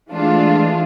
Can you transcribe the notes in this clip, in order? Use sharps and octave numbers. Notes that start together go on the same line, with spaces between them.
E3 G#3 A3 D4 F4